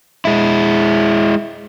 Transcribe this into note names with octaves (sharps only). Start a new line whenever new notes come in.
G#3 E4